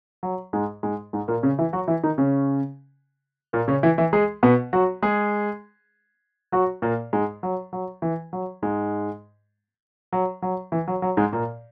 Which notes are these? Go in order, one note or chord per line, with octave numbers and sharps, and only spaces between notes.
F#3
G#2 G#3
G#2 G#3
G#2 G#3
A#2 A#3
C#3 C#4
E3 E4
F#3 F#4
E3 E4
D#3 D#4
C#3 C#4
A#2 A#3
C#3 C#4
E3 E4
E3 E4
G#3 G#4
B2 B3
F#3 F#4
G#3 G#4
F#3 F#4
A#2 A#3
G#2 G#3
F#3
F#3
E3
F#3
G#2 G#3
F#3
F#3
E3
F#3
F#3
G#2 G#3
A#2 A#3